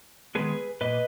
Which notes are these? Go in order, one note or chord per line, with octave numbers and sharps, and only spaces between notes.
D#3 G#3 B3 G#4 B4
A#2 A#3 B4 D#5